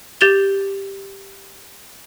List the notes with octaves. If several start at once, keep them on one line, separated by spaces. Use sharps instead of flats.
G4 G6 A6 E7 F7 G7